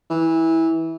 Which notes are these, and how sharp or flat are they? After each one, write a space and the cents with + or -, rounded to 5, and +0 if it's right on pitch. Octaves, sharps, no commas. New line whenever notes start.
E3 -15